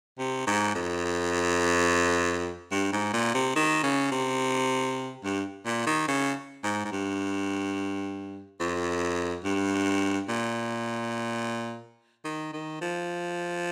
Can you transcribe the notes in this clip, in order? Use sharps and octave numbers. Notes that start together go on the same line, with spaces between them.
C3
G#2
F2
G2
G#2
A#2
C3
D#3
C#3
C3
G2
A#2
D#3
C#3
G#2
G#2
G2
F2
G2
A#2
D#3
D#3
F3